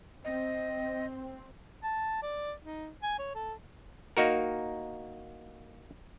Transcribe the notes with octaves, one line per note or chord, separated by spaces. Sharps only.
C4 D#5
A5
D5
D#4
G#5
C#5
A4
A#3 D#4 F#4 A#4